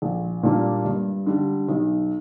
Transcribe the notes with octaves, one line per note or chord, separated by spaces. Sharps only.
A#1
A#2 G3 A#3 D4
G2
D3 G3
B1